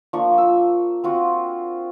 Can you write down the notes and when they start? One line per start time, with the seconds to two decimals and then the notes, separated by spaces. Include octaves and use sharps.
0.13 F3 A#3 D4 C#6
0.38 E6
1.04 C4 F4 F#4